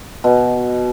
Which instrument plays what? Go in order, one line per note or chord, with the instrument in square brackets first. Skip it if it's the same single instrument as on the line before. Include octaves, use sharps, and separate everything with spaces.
[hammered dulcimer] B2